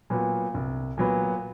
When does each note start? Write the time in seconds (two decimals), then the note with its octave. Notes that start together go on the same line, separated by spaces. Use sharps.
0.10 A#2 F#3 B3
0.54 C2
0.98 A#2 F#3 B3